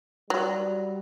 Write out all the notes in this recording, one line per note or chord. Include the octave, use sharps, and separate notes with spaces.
F#3 G3